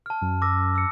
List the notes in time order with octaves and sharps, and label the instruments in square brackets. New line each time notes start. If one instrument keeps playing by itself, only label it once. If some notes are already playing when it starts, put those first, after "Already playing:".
[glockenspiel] A5 F6
[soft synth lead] F#2
[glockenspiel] D6 E6 A#6
E6 C#7